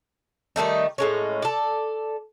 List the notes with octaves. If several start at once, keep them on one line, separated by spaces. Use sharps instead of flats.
D#3 G3 A3 D#4
A2 G#3 C#4
A4 D5